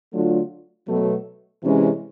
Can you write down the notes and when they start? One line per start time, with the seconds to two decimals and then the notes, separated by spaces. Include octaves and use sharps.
0.14 D3 F#3 A3 D4 F4
0.88 B2 F#3 A3
1.62 C3 E3 G#3 C#4